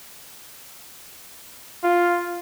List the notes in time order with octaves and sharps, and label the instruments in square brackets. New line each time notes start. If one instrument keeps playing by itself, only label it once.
[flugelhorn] F4